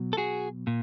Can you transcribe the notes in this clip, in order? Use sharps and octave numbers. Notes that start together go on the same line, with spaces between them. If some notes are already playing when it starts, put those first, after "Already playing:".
Already playing: B2 F#3
A4
F#4 G#4
A#2